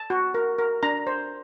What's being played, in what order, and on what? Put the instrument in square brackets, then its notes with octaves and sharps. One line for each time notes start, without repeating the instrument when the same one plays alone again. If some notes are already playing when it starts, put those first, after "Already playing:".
Already playing: [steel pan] A5
F#4
A#4
A#4
D4 A#5
C5